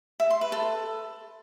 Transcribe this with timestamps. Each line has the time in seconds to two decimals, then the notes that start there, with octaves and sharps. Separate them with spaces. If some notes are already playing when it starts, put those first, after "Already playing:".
0.20 E5
0.30 C6
0.41 B4
0.52 A4